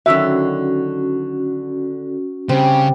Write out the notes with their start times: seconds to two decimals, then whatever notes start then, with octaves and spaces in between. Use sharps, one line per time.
0.06 D3 D#3 F#3 C#4 F#4 E5
2.49 C#3 G3 C4 D4